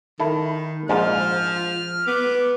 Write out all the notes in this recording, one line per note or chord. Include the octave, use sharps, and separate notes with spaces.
D#3 E4 A4
A#1 G#2 F3 F6
B3 D6